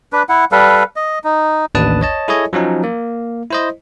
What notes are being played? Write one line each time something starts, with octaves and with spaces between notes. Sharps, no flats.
D4 B4
E4 F#5
G3 A4 B4 F5
D#5
D#4
A1 D#2 D4 B4 A5 D#6
C#5 D#5 A5
E4 G#4 A4 C#5 D#5 G#5
F3 F#3 C#4 D#4
A#3
E4 C5 D#5